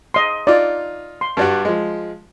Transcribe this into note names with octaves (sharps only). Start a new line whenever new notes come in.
D#5 C6
D#4 F4 D5
C6
G2 G3 F#4
F3 G#3